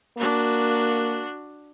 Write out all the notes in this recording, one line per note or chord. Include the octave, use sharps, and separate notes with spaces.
A#3 D4 F#4